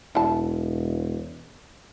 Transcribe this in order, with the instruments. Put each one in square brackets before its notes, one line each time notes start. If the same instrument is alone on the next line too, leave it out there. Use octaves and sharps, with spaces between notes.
[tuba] E1 [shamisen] E4 A5